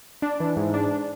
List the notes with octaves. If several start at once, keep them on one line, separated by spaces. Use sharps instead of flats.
D4
E3
G#2
D4